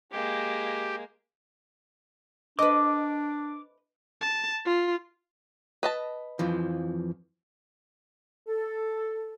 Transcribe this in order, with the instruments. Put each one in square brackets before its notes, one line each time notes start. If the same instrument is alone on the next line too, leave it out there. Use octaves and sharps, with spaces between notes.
[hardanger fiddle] G#3 A#3 [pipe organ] G4
[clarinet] D4 [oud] B4 D#5 [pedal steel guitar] D6
[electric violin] A5
F4
[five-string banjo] B4 D#5 A5
[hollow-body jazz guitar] F2 E3 F3
[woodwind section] A4